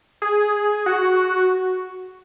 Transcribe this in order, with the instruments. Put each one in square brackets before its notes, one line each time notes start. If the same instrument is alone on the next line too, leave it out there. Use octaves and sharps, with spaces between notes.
[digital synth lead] G#4
F#4